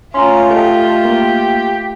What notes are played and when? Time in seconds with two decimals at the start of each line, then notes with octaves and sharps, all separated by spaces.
0.14 A3 C#4 F4 A#5 C6
0.50 G4 A4 D#5 A5
1.05 A#3